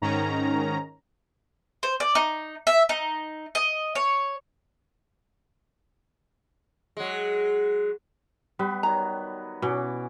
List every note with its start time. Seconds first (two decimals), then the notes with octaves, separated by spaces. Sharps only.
0.02 G#2 D#3 C#4 A#5
1.83 C5
2.00 D5
2.15 D#4
2.67 E5
2.89 D#4
3.55 D#5
3.95 C#5
6.97 F#3 G#3
8.59 G3 B3 B4
8.83 D#3 F#3 A#5
9.62 B2 E3 C#4 D6